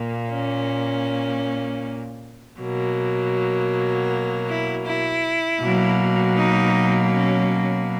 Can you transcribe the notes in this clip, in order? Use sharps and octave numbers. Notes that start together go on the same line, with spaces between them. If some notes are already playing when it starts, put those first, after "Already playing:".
Already playing: A#2 A#3
C#4
B2 F#3 A#3
E4
E4
B2 F#3 A#3
D#4
C#4